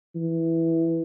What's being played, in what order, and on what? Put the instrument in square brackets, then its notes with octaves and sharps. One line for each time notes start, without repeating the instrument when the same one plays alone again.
[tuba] E3